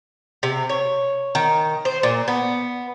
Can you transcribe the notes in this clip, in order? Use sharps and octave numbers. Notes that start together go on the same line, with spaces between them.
C3
C#5
D#3
C5
A#2
B3